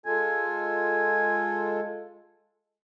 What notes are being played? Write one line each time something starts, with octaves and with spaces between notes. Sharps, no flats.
G#3 F4 A4 G#5